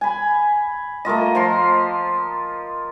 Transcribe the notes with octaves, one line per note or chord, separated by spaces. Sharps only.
G#5 B5
A3 A#3 F4 D#5
F3 A#5 C6